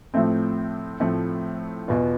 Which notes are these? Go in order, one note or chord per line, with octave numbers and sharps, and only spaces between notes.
A2 F3 A3 C4
A2 F3 A3 C4
E2 B2 B3 F4